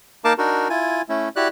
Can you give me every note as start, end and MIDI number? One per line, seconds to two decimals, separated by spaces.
0.25 0.33 58
0.25 0.33 63
0.25 0.33 70
0.25 0.33 77
0.25 0.33 81
0.25 0.33 86
0.38 0.68 62
0.38 0.68 63
0.38 0.68 66
0.38 0.68 70
0.70 1.02 64
0.70 1.02 65
0.70 1.02 80
1.09 1.29 57
1.09 1.29 61
1.09 1.29 64
1.36 1.48 64
1.36 1.48 66
1.36 1.48 67
1.36 1.48 74
1.36 1.48 90